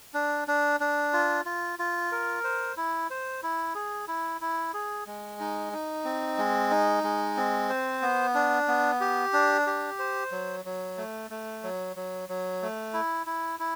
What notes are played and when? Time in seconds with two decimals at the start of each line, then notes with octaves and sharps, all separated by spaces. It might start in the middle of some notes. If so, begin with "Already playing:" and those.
0.14 D4
0.48 D4
0.80 D4
1.13 F4
1.46 F4
1.79 F4
2.12 A#4
2.44 C5
2.77 E4
3.10 C5
3.43 E4
3.75 G#4
4.08 E4
4.41 E4
4.74 G#4
5.07 G#3
5.40 D#4
5.73 D#4
6.05 C4
6.38 G#3
6.71 D#4
7.03 G#3
7.37 C4
7.69 C5
8.02 B3
8.35 D4
8.68 B3
9.00 G4
9.33 D4
9.67 G4
9.99 C5
10.31 F#3
10.65 F#3
10.97 A3
11.30 A3
11.63 F#3
11.96 F#3
12.29 F#3
12.62 A3
12.94 E4
13.27 E4
13.60 E4